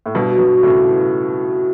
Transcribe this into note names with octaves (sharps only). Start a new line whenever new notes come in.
A2
G2 B2
G2 B2
A2 C#3